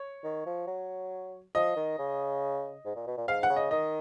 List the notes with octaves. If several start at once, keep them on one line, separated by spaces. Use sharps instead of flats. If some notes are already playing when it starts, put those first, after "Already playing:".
Already playing: C#5
D#3
F3
F#3
F3 D#5
D#3
C#3
G#2
A#2
B2
A#2
G#2 F5
F#5
C#3
D#5
D#3 D#5